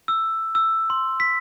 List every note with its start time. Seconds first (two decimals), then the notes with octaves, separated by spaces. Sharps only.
0.08 E6
0.55 E6
0.90 C6
1.20 B6